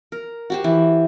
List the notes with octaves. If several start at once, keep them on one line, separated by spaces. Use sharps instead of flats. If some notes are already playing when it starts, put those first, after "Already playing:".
A#4
F#4 G4 C5
E3